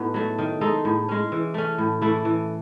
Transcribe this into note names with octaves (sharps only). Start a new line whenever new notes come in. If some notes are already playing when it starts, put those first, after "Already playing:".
Already playing: A2 B3 D#4 F#4
F#3 A3
D#3
G#3 D#4 A4
A2
G#3 C#4
E3
A3 C#4
A2
E3 A3 E4
E3